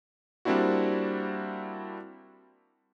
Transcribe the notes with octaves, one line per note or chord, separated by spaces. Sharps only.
G3 A#3 C4 D4 E4 F#4